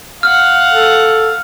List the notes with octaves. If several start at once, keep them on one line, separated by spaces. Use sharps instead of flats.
F5 F#5 F6
A4